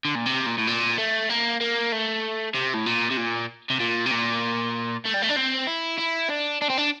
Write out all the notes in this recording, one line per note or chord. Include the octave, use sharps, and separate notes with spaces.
D3
A#2
C3
A#2
A2
A#2
A3
A#3
A#3
A3
C3
A2
A#2
C3
A#2
C3
A#2
C3
A#2
A3
G3
A3
D4
C4
E4
E4
D4
D4
C4
D4